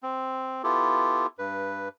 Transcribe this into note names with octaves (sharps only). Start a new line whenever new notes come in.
C4
B3 E4 F4 G4 A4
G2 B4